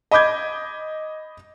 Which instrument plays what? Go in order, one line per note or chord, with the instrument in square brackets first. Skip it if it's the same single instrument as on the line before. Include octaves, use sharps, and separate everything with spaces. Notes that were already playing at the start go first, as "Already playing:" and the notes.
[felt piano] D#5 B5 D6 G6 G#6